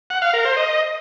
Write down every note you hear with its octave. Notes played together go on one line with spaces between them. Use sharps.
F#5
F5
A#4
C5
D#5